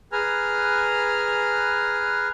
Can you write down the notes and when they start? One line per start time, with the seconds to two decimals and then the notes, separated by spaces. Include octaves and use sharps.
0.12 G#4 B4 G#5 A#5 F6